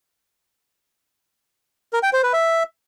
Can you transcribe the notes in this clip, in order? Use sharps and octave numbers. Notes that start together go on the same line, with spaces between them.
A#4
G5
C5
B4
E5